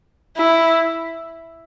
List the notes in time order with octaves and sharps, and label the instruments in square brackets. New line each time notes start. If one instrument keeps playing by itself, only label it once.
[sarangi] E4